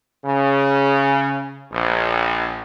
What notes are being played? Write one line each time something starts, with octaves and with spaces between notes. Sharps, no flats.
C#3
A#1